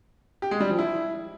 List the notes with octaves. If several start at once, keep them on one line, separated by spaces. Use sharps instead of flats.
G4
G#3
G3
F3
E4